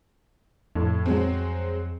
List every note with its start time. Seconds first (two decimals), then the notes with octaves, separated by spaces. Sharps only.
0.76 F2 A2
1.06 F#3 G#3 C4